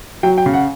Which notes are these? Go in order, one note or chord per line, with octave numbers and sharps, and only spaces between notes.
F#3 G5
G5
C#3
F#5